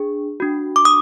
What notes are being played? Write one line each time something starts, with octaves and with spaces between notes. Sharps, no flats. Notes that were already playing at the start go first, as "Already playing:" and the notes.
Already playing: D4 G#4
D4 F#4
D6
D#6